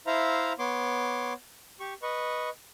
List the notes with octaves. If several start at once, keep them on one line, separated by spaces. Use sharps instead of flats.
E4 C5 E5 F5 A#5
B3 C#5 C6 D6
G4 C#6
B4 D#5 C#6